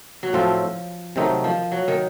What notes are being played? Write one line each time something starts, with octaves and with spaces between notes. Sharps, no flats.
F#3
A2 F3 A3 C4 F4 A4
C3 D#3 F#3 A3 C4 D#4
F3
F#3
D#3